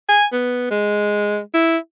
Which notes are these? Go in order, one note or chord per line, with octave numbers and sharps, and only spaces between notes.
G#5
B3
G#3
E4